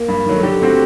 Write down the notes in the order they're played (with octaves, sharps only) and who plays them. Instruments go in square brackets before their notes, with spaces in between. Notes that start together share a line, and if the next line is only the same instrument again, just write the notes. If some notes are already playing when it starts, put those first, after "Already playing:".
Already playing: [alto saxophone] A#3
[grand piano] G2
D#3 F#3 A3
[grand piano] D3 [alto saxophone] G4
[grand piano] A3 C4 F#4